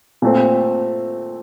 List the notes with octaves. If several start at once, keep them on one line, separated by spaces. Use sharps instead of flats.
A#2 A3 C4